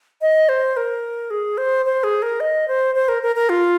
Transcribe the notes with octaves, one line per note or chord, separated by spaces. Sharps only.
D#5
C5
A#4
G#4
C5
C5
G#4
A#4
D#5
C5
C5
A#4
A#4
A#4
F4